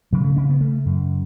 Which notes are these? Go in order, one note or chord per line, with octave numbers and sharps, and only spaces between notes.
C#3 F#3
A3
C#3 C#4
B3
C#3 A3
F#2